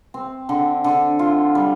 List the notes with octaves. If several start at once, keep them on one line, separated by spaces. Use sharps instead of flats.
C4
D3
D3
F4
G3